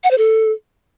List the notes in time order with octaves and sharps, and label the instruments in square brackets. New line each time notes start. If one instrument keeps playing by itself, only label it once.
[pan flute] F#5
C5
A4